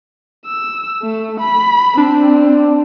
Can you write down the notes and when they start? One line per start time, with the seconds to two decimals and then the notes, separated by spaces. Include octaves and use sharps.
0.46 E6
1.02 A3
1.40 B5
1.97 C4 D4